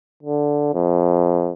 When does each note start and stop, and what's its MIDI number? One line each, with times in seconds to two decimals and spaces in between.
0.23 0.74 50
0.74 1.52 41